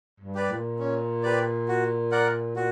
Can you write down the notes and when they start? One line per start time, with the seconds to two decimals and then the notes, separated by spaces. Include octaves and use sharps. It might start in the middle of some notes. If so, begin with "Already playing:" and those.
0.20 G2
0.35 G4 B4 D5
0.50 A#2
0.79 C#4
1.23 G4 B4 D5
1.68 F#4
2.12 A#4 D5 F#5
2.56 A#2 F#4